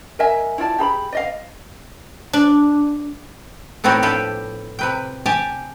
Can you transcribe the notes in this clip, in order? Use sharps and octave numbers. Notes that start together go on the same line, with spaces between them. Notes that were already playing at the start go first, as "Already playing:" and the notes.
A#4 D#5 E5 G#5
E4 F4 D5 A5
G4 G#4 A#5 B5
D5 D#5 F5
D4
A2 B3 C4 D#4 F#4 G4
F3 D4 G4 A4 B4
C3 B4 G5
G4 G#5 A5